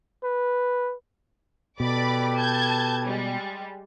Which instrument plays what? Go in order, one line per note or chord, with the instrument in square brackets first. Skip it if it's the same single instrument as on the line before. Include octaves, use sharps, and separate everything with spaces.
[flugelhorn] B4
[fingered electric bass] B2 [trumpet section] G4 A4 B4 [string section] D5 B5 D6
[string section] A5 G6 G#6
G3 G#3